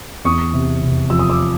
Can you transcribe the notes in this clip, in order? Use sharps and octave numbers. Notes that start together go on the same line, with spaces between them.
E2 C#6 D#6
C3
F1
F3 E6
D#6
D6 E6